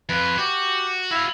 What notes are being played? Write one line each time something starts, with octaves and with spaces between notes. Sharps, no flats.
F2 F4 B4
F#4 G4
E4 F#4 F5